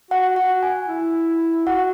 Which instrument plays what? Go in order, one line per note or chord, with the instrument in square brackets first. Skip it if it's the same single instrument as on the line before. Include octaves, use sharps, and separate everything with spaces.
[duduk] F#4 [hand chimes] F#5
[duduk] F#4 [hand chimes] F#5
[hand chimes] G#5
[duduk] E4
[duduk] F#4 [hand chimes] F#5